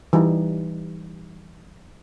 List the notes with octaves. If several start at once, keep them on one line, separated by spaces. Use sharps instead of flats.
E3 G3 D#4